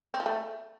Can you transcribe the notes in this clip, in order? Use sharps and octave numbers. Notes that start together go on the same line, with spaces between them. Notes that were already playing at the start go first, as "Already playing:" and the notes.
C4
F3
A3